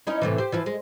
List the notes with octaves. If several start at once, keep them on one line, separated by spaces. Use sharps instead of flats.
C#4 D#4 E4
A2 C3 E3
G4 C5
E3 F3 E4
G#3